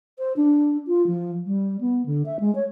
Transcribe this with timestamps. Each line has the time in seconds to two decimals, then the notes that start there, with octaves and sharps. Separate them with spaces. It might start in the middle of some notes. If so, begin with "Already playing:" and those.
0.19 C5
0.36 D4
0.87 F4
1.07 F3
1.46 G3
1.81 B3
2.06 D3
2.25 E5
2.40 G#3
2.55 C#5